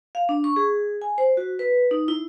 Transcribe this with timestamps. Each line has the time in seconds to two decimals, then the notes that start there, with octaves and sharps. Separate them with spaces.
0.15 F5
0.29 D4
0.44 C#6
0.56 G#4
1.02 G#5
1.18 C5
1.37 F#4
1.59 B4
1.91 D#4
2.08 E4